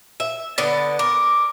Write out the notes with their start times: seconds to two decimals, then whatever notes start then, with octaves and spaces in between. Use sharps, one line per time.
0.20 E5
0.58 D3 B3 D5
0.99 A#4 D6